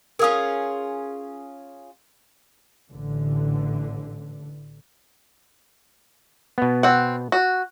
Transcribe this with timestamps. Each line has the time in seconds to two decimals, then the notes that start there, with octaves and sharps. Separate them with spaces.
0.19 C#4 F4 G#4 A#4 D#6
2.91 A1 D3
6.58 B2 B3
6.83 C4 F#5
7.32 F#4